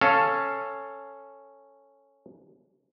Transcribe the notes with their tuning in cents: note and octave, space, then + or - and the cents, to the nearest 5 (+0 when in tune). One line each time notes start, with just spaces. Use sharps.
C#4 +0 A4 +5 F5 +0